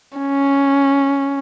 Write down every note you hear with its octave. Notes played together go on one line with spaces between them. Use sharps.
C#4